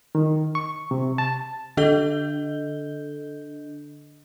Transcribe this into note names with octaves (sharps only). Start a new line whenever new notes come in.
D#3
C#6
C3
A5
D3 D4 A4 D#5 G6 G7